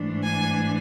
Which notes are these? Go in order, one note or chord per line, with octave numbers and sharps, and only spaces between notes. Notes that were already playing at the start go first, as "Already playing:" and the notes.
Already playing: G#2 E3 A3 D4
G#5